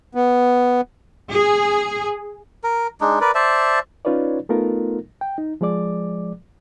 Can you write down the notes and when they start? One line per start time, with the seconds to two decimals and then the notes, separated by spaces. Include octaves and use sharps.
0.15 B3
1.34 G#4
2.64 A#4
3.01 G#3 D4 D#4
3.21 A#4 B4 D5
3.35 C5 D5 E5 A5
4.05 C#4 D#4 F4 B4 C#5 D5
4.49 A3 B3 D#4 F4 A4 A#4
5.21 G5
5.38 D#4
5.61 F3 G#3 G#4 D5 D6